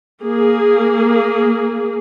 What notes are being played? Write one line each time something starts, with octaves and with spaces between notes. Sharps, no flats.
A#3 G#4